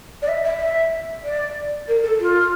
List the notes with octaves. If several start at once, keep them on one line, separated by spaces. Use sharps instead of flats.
D5
E5
E5
E5
D5
A#4
A4
F4